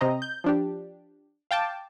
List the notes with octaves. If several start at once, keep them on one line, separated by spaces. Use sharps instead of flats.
C3 C4 D#5 A#5
G6
F3 D4 G4
F5 G5 A5 D6